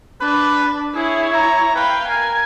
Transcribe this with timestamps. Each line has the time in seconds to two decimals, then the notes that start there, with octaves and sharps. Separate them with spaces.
0.21 D4 B4
0.95 E4 G#4 C#5
1.34 A#5
1.76 B4 F5 G5
2.08 A#4 G#5